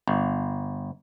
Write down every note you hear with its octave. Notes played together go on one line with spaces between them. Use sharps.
G1